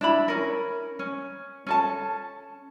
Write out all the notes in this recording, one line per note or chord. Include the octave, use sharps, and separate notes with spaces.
D4 E4 B5
C#4 A#4
C#4
C#4 A4 A5